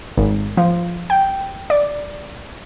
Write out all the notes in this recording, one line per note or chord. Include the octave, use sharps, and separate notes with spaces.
G#1
F3
G5
D5